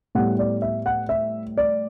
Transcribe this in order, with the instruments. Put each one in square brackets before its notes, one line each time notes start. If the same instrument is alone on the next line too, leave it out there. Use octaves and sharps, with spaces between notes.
[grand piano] A2 G3 B3 F#5
D5
E5
F#5
E5
D5